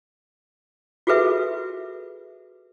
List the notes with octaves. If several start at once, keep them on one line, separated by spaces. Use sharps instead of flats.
F4 F#4 G#4 A4 B4 E5